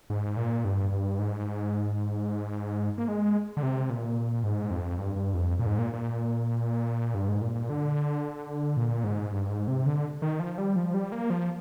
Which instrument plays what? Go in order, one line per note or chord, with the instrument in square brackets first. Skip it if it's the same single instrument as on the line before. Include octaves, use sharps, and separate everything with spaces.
[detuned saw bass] G#2
A#2
G2
G2
G#2
A#3
G#3
D3
C3
A#2
G#2
F2
G2
G2
F2
A#2
G#2
A#2
A#2
G2
G#2
A#2
A#2
D3
A#2
G#2
G2
G#2
C3
D3
D#3
F3
G3
F3
G3
A#3
F3